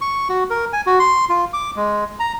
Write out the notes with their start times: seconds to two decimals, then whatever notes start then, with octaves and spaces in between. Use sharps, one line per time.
0.01 C#6
0.29 F#4
0.50 A#4
0.73 G#5
0.86 F#4
0.99 C6
1.29 F4
1.53 D6
1.76 G#3
2.20 A#5